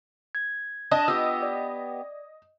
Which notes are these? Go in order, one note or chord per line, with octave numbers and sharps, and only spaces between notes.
G#6
D4 D#5
B3 F4 G4 E6
D5